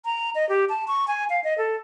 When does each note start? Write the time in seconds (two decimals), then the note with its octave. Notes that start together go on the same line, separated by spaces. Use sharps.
0.05 A#5
0.35 D#5
0.49 G4
0.69 A5
0.88 C#6
1.08 G#5
1.30 F5
1.44 D#5
1.58 A4